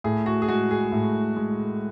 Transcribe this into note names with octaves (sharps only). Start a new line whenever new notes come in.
A2 G#4
F#4
G#4
G#3 F#4
G#4
A2
G#3